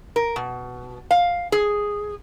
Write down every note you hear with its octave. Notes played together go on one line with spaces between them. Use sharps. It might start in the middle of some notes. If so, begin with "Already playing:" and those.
A#4
B2
F5
G#4